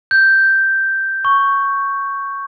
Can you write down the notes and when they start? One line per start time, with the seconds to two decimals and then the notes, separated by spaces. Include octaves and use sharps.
0.11 G6
1.25 C#6